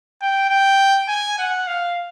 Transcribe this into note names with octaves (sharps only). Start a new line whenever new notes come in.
G5
G5
G#5
F#5
F5